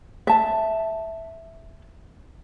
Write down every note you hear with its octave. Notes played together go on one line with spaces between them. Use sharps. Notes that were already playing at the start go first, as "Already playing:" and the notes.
E5 A5